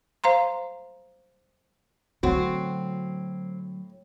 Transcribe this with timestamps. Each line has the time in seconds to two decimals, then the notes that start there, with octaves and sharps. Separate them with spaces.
0.24 C5 F5 A#5 C6
2.23 A2 D3 F#3 C4 F#4